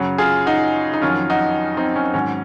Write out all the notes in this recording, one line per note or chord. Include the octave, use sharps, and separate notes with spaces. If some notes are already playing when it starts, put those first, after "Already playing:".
Already playing: F#2 C#3 F#3
F4 G#4
D#4 F#4
D#4
F2 D#3 F#3 C#4 F4
D#4 F#4
C4 D#4
C#4
G#2 D#3 F#3 C#4